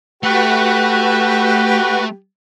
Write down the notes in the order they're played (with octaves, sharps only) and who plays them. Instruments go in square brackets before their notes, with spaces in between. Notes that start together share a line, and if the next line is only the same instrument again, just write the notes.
[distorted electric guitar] A3 [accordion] F#4 B4 [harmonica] G4